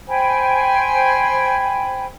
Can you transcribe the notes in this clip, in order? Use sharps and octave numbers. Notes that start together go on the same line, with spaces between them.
C5 G5 G#5 B5